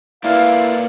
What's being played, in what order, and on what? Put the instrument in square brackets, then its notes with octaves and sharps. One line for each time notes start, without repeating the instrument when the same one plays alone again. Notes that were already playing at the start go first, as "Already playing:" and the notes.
[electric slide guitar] A#3 B4 D5 [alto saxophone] E4 [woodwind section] F5